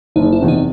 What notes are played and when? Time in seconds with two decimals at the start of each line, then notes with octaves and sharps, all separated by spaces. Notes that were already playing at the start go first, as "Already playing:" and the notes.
0.16 F#1 D#4
0.32 E4
0.41 E2 C3
0.48 D#4